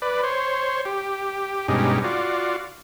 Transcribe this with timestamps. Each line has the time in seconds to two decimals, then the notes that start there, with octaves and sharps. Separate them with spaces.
0.02 B4 D5
0.23 C5 C#5
0.85 G4
1.68 G2 B2 G#3 C#4 D#4 G4
2.04 F4 F#4 D5